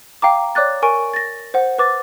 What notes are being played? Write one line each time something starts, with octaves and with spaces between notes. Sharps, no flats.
F5 G5 A#5 D6
C#5 D5 D6 F#6 A6
A#4 G#5 C#6 D7
A6 A#6
C5 F#5
B4 D6 A6